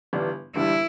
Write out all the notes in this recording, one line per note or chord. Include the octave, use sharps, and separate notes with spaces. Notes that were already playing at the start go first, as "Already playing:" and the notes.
G1 G2 E3 G3 D4
G1 G2 E3 G3 D4 E4